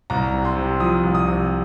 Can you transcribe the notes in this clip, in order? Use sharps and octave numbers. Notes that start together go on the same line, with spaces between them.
C2 A#5
C3
C6
C3
F3 D#6
C2
D#6
C3